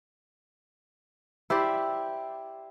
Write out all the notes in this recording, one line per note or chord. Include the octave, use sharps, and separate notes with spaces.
E4 G4 C5 D5